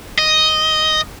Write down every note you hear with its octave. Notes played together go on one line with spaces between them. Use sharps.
D#5